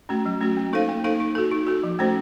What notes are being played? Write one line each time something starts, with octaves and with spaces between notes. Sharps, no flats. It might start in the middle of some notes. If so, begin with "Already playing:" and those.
A3 C#4 F#4
F#3
A3 C#4 F#4
A#3
D#4 A4 C5 F5
A#3
D#4 A4 C5 F5
D#4
F#4 A4
D#4
F#4 A4
F3
A3 C#4 F#4 C5